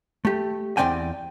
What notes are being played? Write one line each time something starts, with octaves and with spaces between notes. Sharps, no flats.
A3 G4
E2 F3 C4 D5 G5 G#5